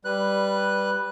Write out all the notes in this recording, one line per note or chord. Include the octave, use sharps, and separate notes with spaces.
G3 B4 F#6